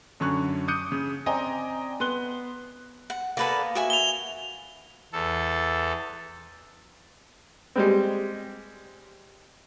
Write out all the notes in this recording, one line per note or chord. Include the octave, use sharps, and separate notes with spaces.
F#2 D3 C#4 C#6 F#6
D6 D#6 F#6 G6 C#7 D#7
C#3
C4 D5 D#5 G5 G#5 A#5
B3 C6 F#6 G7
F#5
A#3 B3 A4 B4 D5
F#4 E5 G#5
F7 G7
E2 A4
G3 G#3 C4